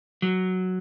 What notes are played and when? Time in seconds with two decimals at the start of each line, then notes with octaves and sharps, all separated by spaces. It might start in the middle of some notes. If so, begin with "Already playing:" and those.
0.22 F#3